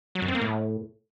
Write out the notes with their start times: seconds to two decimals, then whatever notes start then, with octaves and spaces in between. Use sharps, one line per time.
0.15 F#3
0.22 F#2
0.28 C4
0.35 A#3
0.41 A2